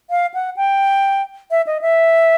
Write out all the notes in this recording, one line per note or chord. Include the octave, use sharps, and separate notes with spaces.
F5
F#5
G5
E5
D#5
E5